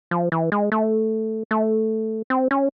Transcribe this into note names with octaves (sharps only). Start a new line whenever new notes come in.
F3
E3
G#3
A3
A3
C4
C#4